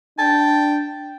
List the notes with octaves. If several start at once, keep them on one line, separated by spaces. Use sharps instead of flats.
D4 G5 A5